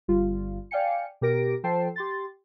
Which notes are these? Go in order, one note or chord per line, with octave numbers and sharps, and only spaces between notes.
G1 G3 F4
D5 F5 G5 G#5 C#7
B2 G4 A#4 A#6 D7
F3 A4 C5 G5 A5 C7
G4 C6 A6